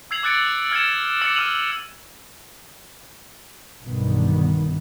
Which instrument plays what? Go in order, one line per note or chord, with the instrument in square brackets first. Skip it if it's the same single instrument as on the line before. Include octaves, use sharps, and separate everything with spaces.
[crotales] E6 G#6 C7 F7 F#7
D6 E6 F#6 A6 C#7 D7
F7
F6 G#6 A6 C#7 E7
D6 E6 A6 C#7 F#7
E6 F6 D#7 F7 F#7
[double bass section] B1 G2 B2 D3 D#3 B3